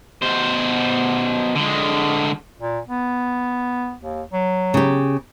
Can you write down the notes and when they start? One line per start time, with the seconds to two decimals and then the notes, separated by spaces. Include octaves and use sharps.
0.22 B2 C5
1.55 D3 G#3
2.59 A#2
2.88 B3
4.01 D#2
4.32 F#3
4.74 C#3 G4